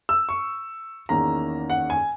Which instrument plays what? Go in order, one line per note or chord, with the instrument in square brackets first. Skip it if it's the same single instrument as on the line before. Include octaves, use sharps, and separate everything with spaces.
[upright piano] E6
C#6
E2 D#3 A#3 C#4 A#5
F#5
G#5